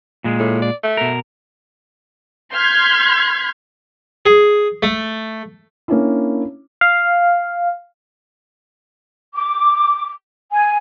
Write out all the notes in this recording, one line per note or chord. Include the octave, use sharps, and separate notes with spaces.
A#2 G#3
A2
D5
A3
B2 A#4
C6 F6 G6 G#6 B6
G#4
A3
A#3 C#4 D4 E4
F5
D6
G#5